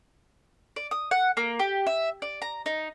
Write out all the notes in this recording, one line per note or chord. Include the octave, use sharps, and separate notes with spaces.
D5
D#6
F#5
A#3
G4
E5
D5
A#5
D#4